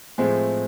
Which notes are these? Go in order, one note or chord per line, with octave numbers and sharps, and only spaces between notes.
A2 F3 G#3 A3 C4 G#4